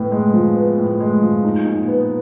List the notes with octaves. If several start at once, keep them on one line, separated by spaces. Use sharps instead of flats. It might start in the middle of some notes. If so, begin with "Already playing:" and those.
Already playing: A2 B3
G#3
F3
B3
A2
G#3
F3
D#4
A#2
B3